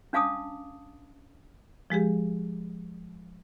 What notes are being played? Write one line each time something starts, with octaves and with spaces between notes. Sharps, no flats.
C#4 D4 F5 A5 D6 D#6
F3 G#3 G4 G#4